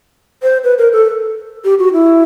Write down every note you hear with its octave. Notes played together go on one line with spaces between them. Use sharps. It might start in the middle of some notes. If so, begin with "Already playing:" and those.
C5
B4
A#4
A4
G4
F#4
E4